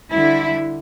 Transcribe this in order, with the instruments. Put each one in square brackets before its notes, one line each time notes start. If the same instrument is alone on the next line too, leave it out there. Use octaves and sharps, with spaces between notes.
[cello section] D3 G3 E4